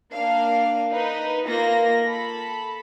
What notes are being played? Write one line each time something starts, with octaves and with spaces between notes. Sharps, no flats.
A#3 D4 F5
D#4 B4
A#3 F4 A#6
A4 B5